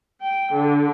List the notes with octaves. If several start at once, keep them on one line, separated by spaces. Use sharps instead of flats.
G5
D3